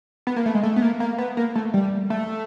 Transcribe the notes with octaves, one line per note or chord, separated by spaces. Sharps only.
B3
A#3
A3
G#3
A3
B3
A#3
A#3
B3
A#3
A3
G3
A3